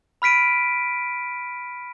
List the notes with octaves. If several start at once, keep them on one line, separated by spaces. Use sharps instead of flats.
B5 F6 B6 D7 D#7